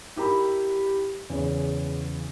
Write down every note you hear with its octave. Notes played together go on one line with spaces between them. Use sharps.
E4 G4 A#4 A#5 B5
E2 C#3